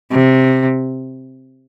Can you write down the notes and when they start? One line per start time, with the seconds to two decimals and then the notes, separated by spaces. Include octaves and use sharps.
0.11 C3